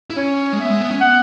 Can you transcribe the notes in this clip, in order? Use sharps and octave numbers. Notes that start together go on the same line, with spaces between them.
E4
C#4 C#5
G#3
B3 E5
G#3
B3
C#4
B3 F#5